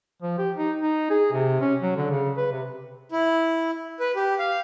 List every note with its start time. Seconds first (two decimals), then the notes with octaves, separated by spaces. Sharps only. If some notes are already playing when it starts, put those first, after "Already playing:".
0.22 F3
0.38 G4
0.56 D#4
0.81 D#4
1.10 G#4
1.32 C3
1.61 C#4
1.82 F#3
1.96 D3
2.10 C#3
2.37 B4
2.52 C3
3.12 E4
4.00 B4
4.16 G4
4.39 F5